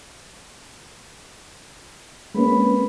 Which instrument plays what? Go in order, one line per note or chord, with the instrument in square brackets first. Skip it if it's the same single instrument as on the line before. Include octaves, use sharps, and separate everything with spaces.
[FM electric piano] G#3 A#3 C#4 [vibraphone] C4 B4 B5